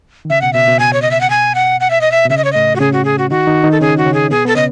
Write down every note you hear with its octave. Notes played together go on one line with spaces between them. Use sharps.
D#3
C#3 E5
B2 F#5
B2 E5
B2
B2 G#5
C#5
D#5
E5
F#5
G#5
F#5
F#5
E5
D#5
E5
B2
C#3 E5
D#5
C#5
A2 A3 D#5
F#4
C#3 C#4 G#4
F#4
G#4
F#4
D#3 D#4 F#4
D#3 D#4
D#3 D#4
A4
C#3 C#4 G#4
F#4
C#3 C#4
G#4
B2 B3 G#4
B3 A4
C#3 C#4 D#5